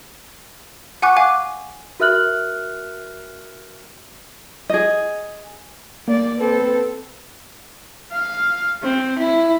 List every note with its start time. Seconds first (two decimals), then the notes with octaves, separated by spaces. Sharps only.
1.02 F#5 G#5 C#6 D6 F#6
1.16 F5 G#5 D6 F#6
2.00 F#4 A#4 E5 F6 F#6 F#7
4.70 G#4 D#5
6.08 A#3 D5
6.38 C4 A4 B4
8.13 F5
8.82 C4
9.19 E4